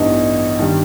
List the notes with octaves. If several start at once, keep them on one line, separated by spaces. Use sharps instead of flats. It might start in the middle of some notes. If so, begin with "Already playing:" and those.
Already playing: A1 G2 E3 B3 D#4
G2 D#3 G3